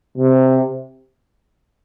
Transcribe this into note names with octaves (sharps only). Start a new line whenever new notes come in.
C3